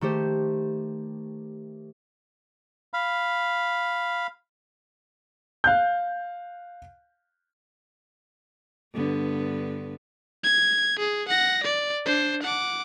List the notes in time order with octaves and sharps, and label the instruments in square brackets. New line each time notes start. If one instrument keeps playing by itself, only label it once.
[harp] D#3 A3 G4 C5
[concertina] F5 B5
[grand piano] F5 F#6 G6
[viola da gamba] G2 D3 B3
[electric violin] G#6
G#4
F#5 A#6
D5
D4 C5
F#5 D6